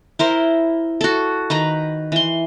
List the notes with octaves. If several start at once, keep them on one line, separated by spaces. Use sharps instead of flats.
E4 A#4 C5
F#4 A4
D#3 B4 A#5
E3 C6